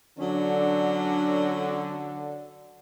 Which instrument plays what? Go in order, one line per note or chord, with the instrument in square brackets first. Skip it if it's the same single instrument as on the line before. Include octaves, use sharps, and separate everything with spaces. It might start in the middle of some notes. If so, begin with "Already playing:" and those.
[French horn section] D3 [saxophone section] F#3 C#4 D4